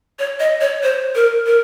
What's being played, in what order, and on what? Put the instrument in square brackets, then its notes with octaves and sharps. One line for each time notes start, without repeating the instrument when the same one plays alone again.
[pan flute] C#5
D#5
C#5
C5
A#4
A#4